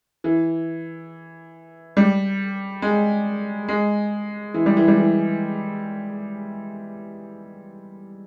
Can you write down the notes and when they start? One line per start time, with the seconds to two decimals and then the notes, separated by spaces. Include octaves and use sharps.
0.24 E3
1.97 G3
2.82 G#3
3.68 G#3
4.54 E3
4.66 G3
4.77 E3
4.88 G3
4.98 E3